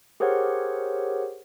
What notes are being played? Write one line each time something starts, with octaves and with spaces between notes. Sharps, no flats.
G4 G#4 A#4 C5 C#5 F#5